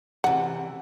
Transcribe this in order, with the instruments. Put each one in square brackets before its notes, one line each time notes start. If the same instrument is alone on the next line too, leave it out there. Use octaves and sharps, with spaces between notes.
[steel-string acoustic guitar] C3 E3 [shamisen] F#5